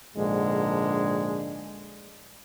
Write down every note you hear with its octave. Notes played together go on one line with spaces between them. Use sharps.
A#1 G#2 D3 G#3